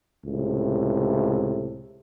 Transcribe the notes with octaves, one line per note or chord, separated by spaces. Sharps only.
C#2 A2 C3